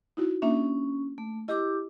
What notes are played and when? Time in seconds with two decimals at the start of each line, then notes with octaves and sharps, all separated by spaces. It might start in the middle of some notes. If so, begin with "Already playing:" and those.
0.17 D#4 E4 F#4
0.42 A#3 C#4 D4 E5
1.18 A3
1.48 E4 G4 D#5 D6 E6